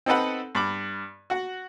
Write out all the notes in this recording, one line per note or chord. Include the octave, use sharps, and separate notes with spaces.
C4 D#4 A4 B4 F#5
G2 B5 D6
F#4 F#5